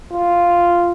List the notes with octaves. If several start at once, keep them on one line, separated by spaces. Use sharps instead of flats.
F4